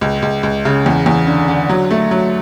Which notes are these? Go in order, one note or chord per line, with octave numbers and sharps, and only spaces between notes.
C#2
C#2
C#2
C#3
E2
E2
D3
D3
F#3
A3
F#3